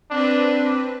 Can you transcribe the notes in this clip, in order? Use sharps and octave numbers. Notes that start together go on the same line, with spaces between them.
C4 D4 B4